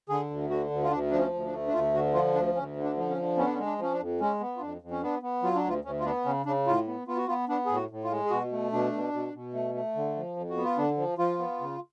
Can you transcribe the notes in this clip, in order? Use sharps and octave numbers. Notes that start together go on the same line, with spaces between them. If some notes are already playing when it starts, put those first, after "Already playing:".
D3 G#4
D2
D3 F#4
D2
F4
D2 D4
F3 D4
C#4
D2
D4
A3
D4
D2 F4
D3 F#4
F3 F4
D2 D4
D2 C#4
D3
D4
F3
C#4
D3
B3 C#4
D4
C#4
G#3
D4
F3 C#4
D4
F2
G#3 C#4
B3
F4
F2 D4
F2
C#4
B3 D4
B3
F#3 F4
D4
D2 F4
D2 C#4
F4
B3 D4
C#3 C#4
C#3 D4
A2 F4
B3
B3 F4
F#4
B3 F4
B3 D4
A2 G#4
F#4
A2
F4
G#3
G#4
B2 F#4
A3
B2 D4
B2
B2
B2
A3
A3
D3
F3
F2
F#4
B3
F4
D3 D4
F3
F3 F4
B3
C#3